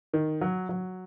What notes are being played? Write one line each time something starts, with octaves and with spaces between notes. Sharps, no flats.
D#3
F#3
F#3